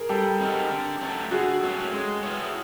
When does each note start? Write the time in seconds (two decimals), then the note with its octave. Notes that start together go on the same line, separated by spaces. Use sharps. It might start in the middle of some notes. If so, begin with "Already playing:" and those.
Already playing: G#4 A#4
0.09 G3 G4 A4
0.40 C4 D#4 F#4 A#4
0.70 D3
1.01 F#3 A3 C#4
1.31 D3 F#4 G#4
1.62 F#3 A3 C#4
1.93 G#3
2.23 B3 E4 G#4 C#5